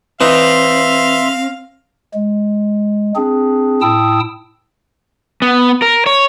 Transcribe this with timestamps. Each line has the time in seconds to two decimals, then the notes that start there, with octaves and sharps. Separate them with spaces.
0.21 E3 C4 D#4 E5 F5 C6
2.14 G#3
3.16 C4 D4 G#4
3.82 A2 E4 G5 A5 D#6 E6
5.42 B3
5.82 A#4
6.06 C#5